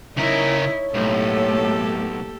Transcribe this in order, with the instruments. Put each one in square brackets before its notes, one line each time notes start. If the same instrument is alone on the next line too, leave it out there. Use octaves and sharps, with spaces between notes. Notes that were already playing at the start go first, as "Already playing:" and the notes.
[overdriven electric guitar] C#3 A#4 [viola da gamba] D#4 [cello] E4 [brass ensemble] C#5
[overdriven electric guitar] B1 [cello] A2 [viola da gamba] A#3 G4 A4